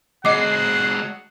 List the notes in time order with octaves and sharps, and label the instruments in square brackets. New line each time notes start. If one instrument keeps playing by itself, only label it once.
[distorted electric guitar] G#3 F#4 [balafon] D#5 D6 [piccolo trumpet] F#5 [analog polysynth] C7